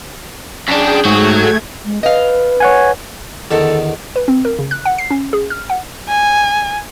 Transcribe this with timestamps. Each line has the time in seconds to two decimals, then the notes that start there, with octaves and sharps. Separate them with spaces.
0.69 F#2 D4 G#4 G5
1.05 G#2 F#3 A3 F#4 G#6
1.85 G#3
2.03 B4 D#5 F5
2.60 C#5 F#5 G#5
3.51 E2 D3 D#3 A4
4.16 B4
4.28 C4
4.45 A#4
4.59 C#3
4.71 F#6
4.85 F#5
4.98 C7
5.10 C#4
5.33 G#4
5.50 F6
5.70 F#5
6.09 G#5